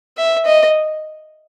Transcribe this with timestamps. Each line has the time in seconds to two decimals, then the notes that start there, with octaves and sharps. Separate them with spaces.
0.17 E5
0.45 D#5